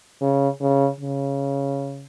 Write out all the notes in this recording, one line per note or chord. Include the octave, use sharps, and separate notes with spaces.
C#3
C#3
C#3